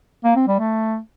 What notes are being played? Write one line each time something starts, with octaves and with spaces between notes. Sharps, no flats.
A#3
C4
G3
A3